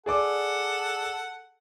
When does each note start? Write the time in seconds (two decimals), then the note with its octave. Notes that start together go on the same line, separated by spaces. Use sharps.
0.06 G#4 A4 D5 F#5 D6